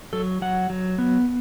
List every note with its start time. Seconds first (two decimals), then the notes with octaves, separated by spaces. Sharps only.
0.13 F#3 A4
0.42 F#3 F#5
0.70 F#3
0.98 B3